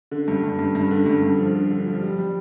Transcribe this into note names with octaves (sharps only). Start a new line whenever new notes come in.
D3
G2
G2
G2
G2
D3
G2
G2
F3
D3
D3
F3
G3
G3